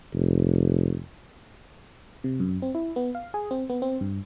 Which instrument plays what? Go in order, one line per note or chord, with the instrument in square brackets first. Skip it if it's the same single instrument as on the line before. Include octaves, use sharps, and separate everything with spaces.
[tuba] F1
[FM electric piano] C3
F#2
C4
E4
B3
F5
G#4
C4
B3
C4
G2